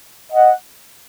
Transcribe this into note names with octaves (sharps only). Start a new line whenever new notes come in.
D#5 F#5